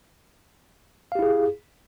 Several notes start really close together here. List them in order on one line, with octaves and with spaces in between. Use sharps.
F5 G4 E4 G#4